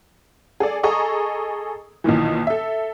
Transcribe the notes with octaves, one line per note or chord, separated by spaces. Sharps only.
G#4 A4 D5
G#4 A4 D#5 A#5 C#6 D#6
B1 A#2 D#3 E3
A4 E5